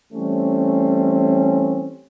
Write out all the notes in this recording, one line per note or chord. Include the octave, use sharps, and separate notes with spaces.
E3 G3 A3 C4 C#4